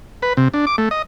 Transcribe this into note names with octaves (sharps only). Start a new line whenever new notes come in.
B4
C3
D4
D6
A3
D#5